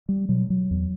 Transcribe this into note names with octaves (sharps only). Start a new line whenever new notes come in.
G3
B2 F#3
F#3
E2